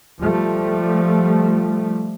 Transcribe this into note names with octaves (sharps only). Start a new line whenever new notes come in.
F3 G3 A3